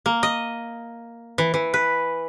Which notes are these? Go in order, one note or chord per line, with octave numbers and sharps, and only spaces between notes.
A#3
D#5
E3
E3
B4